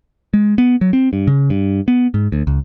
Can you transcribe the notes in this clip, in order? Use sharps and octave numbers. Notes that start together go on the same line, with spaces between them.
G#3
B3
F#3
C4
G2
C#3
G2
B3
G#2
D2
C#2